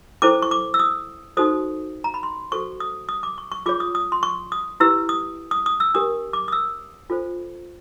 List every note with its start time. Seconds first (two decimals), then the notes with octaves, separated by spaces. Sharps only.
0.22 C#4 E4 A4 C5 D6
0.42 C#6
0.51 D6
0.74 E6
0.79 D#6
1.37 D#4 F#4 A4 C5 D#6
2.04 A#5
2.14 B5
2.23 C6
2.52 F#4 A4 C5 C#6
2.80 D#6
3.09 D#6
3.23 D6
3.38 C#6
3.52 C#6
3.66 F4 G#4 C#5 D6
3.80 D#6
3.95 D#6
4.12 C6
4.23 C#6
4.52 D#6
4.80 E4 G4 B4 E6
5.09 D#6
5.51 D#6
5.66 D#6
5.80 E6
5.94 D4 G4 A#4 D#6
6.33 D6
6.48 D#6
6.52 E6
7.09 D4 F4 A4 C5